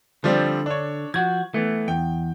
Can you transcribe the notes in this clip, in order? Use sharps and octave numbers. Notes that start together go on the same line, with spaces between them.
D3 F3 G3 C4
D4 C#5
F3 F#4 G#6
E3 A3 B3
E2 G5